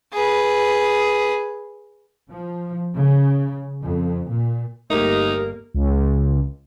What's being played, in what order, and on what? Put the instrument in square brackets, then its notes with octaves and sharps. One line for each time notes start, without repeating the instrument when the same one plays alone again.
[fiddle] G#4 B4
[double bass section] F3
C#3
F2
A#2
[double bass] G1 A#3 [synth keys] A3 G4 [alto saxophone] D#4 [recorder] A#4
[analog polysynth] C#2